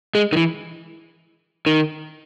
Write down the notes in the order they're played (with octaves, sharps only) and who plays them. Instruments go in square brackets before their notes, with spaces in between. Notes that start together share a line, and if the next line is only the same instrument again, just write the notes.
[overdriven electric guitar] G#3
D#3
E3
D#3